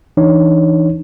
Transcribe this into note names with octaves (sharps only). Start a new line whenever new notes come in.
E3 D4 D#4 C#5